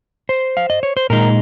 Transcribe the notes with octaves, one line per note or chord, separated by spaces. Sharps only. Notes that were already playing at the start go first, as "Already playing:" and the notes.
C5
F5
D#5
C#5
C5
A#2 G#3 D#4 A#4